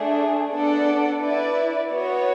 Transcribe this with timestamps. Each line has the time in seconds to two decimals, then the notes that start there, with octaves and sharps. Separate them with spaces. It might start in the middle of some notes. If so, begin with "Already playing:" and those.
Already playing: A3 D4 G#4
0.53 B3 D4 A4 D5 F#5
1.21 E4 B4 D5
1.90 B3 F#4 C#5